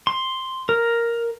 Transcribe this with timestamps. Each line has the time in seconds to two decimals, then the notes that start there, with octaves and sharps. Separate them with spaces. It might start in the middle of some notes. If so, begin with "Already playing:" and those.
0.07 C6
0.69 A#4